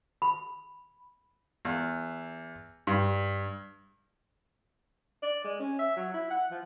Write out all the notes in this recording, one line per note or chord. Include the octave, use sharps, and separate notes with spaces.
B5
E2
G2
D5
G#3
C#4
E5
F#3
E4
F#5
F3